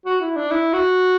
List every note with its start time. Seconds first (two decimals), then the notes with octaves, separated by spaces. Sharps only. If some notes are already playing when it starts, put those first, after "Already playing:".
0.06 F#4
0.21 E4
0.36 D4
0.51 E4
0.73 F#4